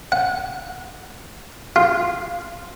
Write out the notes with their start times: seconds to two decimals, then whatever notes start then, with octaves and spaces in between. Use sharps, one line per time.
0.12 F#5
1.76 F4